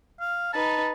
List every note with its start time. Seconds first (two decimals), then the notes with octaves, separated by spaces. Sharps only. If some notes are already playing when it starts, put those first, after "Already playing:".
0.20 F5
0.53 D#4 B4 A5